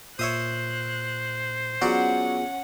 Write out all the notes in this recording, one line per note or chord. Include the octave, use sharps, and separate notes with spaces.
A#2 C5 C#5 E5 D#6 F#6
F#3 B3 C#4 F4 F#4 G#4 D5 F#5